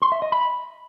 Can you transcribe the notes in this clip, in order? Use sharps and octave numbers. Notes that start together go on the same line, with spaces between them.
C6
E5
D#5
B5